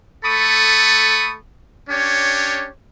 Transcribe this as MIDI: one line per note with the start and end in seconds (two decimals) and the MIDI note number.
0.24 1.35 57
0.24 1.35 69
0.24 1.35 83
0.24 1.35 85
0.24 1.35 87
1.89 2.67 61
1.89 2.67 62
1.89 2.67 67
1.89 2.67 73